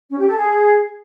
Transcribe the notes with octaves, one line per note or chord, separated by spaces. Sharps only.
C#4
G4
A4
G#4